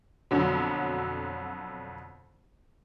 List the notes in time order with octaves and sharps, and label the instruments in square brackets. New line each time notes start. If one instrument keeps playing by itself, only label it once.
[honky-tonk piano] F2 B2 D3 F#3